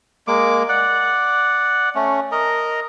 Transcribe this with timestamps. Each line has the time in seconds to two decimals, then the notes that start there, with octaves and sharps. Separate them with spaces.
0.27 G#3 A#3 D6
0.69 D5 F#5
1.95 A3 C#4
2.32 A#4 D#5 A#5